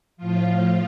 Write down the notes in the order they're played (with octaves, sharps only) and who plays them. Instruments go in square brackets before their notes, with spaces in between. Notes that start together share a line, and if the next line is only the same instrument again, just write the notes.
[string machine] A2 F3 F4